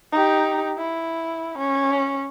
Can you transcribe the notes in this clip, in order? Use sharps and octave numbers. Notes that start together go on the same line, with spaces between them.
D#4 G4
E4
C#4